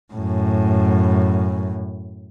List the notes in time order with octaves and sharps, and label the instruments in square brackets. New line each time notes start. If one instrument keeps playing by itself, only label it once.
[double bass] F#2 A2